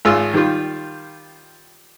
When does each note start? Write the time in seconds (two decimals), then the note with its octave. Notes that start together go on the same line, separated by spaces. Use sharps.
0.05 G#1 F4 G#4 E6 F6
0.34 D#3 G3 F4